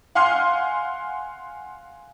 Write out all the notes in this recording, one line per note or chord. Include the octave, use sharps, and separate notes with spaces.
F5 F#5 G#5 C6 F6 C7